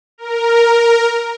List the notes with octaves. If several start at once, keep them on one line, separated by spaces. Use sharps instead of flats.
A#4